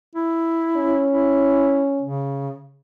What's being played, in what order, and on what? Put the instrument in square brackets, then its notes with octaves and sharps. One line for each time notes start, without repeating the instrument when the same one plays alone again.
[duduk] E4
[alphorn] C#4
[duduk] E4
C#3